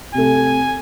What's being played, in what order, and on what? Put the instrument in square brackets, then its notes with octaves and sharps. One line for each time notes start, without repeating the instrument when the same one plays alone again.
[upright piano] C3 A3 [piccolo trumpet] G#5